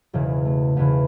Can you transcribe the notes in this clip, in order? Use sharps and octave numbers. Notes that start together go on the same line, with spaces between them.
E1 E2 C#3
A3
E1 E2 C#3 B3